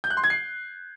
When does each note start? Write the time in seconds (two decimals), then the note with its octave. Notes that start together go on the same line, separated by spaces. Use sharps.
0.04 G6
0.10 F#6
0.17 C6
0.24 G#6
0.30 C7